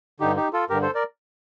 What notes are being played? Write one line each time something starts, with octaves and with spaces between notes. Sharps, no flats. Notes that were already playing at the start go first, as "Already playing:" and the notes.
G2 D3 D#4 G4
D#4 G4
F4 A4
G2 D3 G4 A#4
A4 C5
A#4 D5